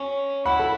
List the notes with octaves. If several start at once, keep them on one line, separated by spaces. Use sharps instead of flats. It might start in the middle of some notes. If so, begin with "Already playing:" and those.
Already playing: C#4
E4 F#5 B5
A4